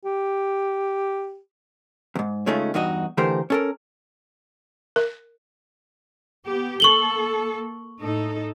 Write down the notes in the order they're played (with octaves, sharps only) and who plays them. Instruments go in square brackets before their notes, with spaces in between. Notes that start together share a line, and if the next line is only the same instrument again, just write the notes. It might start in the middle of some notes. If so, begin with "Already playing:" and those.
[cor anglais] G4
[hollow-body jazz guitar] E2 G#2
C#3 G#3 A3 C#4 D#4 F4
E2 G2 D#4 F#4 D#5
D3 E3 A3 G4 A#4 C5
C#4 A4 A#4
[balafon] A#4
[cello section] B3 G4
[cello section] A#3 A4 [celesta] C#6 F#7 G7
[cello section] A2 D#4 A4